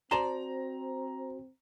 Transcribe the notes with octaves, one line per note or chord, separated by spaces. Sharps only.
C4 F#4 C5 D5 A5 A#5 C6